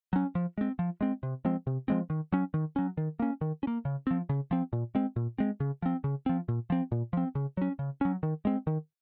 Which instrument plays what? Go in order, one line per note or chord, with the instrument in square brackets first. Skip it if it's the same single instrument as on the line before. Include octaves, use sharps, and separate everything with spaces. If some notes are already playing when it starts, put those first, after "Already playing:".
[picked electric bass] F#3 C#4
F3
G#3 C4
F3
G#3 C4
C3
F3 G#3 C4
C3
F3 G#3 C4
D#3
F#3 C#4
D#3
F#3 C#4
D#3
A#3 C#4
D#3
C#4
A#3
C#3
F3 C4
C#3
F3 C4
A#2
G#3 C4
A#2
G#3 C4
C#3
F3 C4
C#3
F3 C4
A#2
F3 C4
A#2
F3 C4
C#3
F#3 C#4
C#3
F#3 C#4
D#3
G#3 C4
D#3